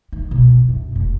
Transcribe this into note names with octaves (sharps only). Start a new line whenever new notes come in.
D#3
B2
F#3
F#2
F1